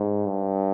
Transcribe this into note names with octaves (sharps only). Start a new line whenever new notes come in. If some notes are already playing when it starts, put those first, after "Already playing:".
Already playing: G#2
G2